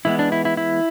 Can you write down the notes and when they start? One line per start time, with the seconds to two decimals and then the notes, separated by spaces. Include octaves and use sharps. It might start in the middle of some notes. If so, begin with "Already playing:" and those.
0.05 E3 G#3 B3 E4
0.19 D4
0.32 E4
0.45 E4
0.57 E4